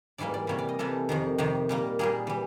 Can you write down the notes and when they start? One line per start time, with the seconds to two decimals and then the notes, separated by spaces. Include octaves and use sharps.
0.18 G#2 E3 G3 A#3 D5
0.34 D5
0.47 C3 E3 G3 A#3 C#5
0.58 D5
0.69 D#5
0.79 C3 E3 G3 A#3 A4
1.09 F2 C3 D#3
1.38 F2 C3 D#3 G4
1.69 A#2 G3 A#3
1.99 A#2 G3 A#3 G#4
2.27 E3 G3